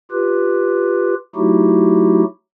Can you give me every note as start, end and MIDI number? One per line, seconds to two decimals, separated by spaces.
0.12 1.15 65
0.12 1.15 67
0.12 1.15 71
1.36 2.24 54
1.36 2.24 57
1.36 2.24 63
1.36 2.24 64
1.36 2.24 66
1.36 2.24 67